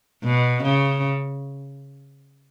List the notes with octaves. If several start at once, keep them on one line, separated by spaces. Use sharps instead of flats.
B2
C#3